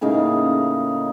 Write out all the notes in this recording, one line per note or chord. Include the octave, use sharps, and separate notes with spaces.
A2 C#3 A#3 D#4